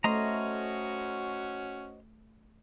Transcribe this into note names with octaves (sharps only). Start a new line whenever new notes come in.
A3 C#4 F#4 C5 D#5 A#5